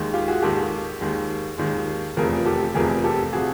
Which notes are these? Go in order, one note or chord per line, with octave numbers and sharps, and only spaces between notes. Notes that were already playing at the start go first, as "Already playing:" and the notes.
Already playing: D#2 D#3 G#3
F4 G4
F#4 G#4
D#2 D#3 G#3 G4 A4
D#2 D#3 G#3
D#2 D#3 G#3
F1 E2 C3 F3 G#4 A#4
G4 A4
F1 E2 C3 F3 G#4 A#4
G4 A4
C3 F3 F#4 G#4